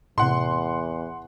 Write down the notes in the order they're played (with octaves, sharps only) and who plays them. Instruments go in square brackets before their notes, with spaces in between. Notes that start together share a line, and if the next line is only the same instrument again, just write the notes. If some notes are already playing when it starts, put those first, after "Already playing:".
[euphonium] E2 [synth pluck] A2 C3 [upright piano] F#5 C6